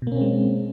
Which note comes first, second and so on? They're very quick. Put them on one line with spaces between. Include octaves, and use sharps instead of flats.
B2 A#3 C#4 C4 G#3